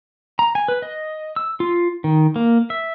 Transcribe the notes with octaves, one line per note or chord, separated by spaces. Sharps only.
A#5
G#5
B4
D#5
E6
F4
D#3
A#3
E5